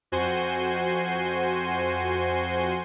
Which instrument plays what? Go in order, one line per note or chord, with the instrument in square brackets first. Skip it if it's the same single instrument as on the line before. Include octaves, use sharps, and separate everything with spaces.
[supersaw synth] F2 F#4 C5 G#5 C6